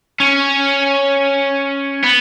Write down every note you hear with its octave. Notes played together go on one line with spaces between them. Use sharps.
C#4
B3